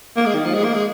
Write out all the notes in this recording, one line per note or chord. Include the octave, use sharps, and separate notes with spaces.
A#3
G#3
D#3
F3
G#3
A#3
G#3